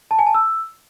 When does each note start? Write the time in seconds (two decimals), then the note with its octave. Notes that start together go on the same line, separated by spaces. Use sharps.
0.11 A5
0.19 G#5
0.27 A5
0.34 E6